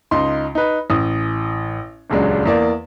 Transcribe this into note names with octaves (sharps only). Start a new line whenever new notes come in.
C#2 D#4 C6
D#4 B4
A1 D#6
D#1 C#2 F#3 G#3 D4
E2 A#3 D5